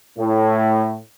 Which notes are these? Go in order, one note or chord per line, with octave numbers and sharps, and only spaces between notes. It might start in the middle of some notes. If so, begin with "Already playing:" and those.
A2